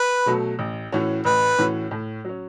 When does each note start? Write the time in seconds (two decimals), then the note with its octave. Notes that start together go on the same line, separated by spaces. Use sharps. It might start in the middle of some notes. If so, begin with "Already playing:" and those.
Already playing: B4
0.26 B2 F#3 A3 F#4
0.59 A1
0.92 A2 E3 C#4 F#4
1.25 A1 B4
1.58 A2 E3 C#4 F#4
1.91 A2
2.25 F#3 C#4